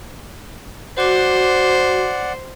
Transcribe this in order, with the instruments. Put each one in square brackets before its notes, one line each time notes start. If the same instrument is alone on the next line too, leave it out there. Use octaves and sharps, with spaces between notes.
[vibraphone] F#4 D6 [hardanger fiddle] C5 [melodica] D5 F#5